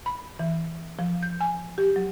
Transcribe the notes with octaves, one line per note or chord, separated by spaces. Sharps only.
B5
E3
F3
G6
G#5
G4
F#3